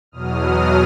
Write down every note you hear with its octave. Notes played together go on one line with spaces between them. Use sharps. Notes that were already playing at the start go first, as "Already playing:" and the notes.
E2 B2 F#3 D#6 F6